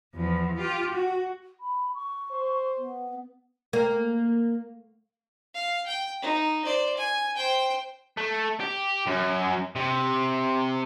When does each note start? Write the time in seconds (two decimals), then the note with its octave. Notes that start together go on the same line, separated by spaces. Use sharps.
0.15 E2 F3
0.58 F4 G4
0.94 F#4
1.60 B5
1.94 C#6
2.31 C5
2.78 B3
3.73 A#3
5.54 F5
5.86 G5
6.21 D#4
6.65 C5 D5
6.97 G#5
7.37 C5 G5
8.17 A3
8.60 G4
9.07 F#2
9.76 C3